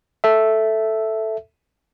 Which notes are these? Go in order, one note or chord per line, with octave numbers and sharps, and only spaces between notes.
A4 E5